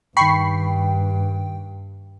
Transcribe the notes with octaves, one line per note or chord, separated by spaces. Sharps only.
G2 D#3 G5 B5 C#6 C7